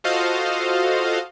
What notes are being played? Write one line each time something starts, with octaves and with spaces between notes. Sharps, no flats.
F4 F#4 A4 C5 D#5 F5